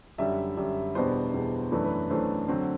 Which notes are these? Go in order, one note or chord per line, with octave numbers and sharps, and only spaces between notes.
F#2 D3 G3 E5
F#2 D3 G3
E2 B2 G3 B3 D4 C5
E2 B2 G3 B3 D4
F#2 E3 A3 D4 B4
B4
F#2 E3 A3 D4 C5
D3 F#3 C4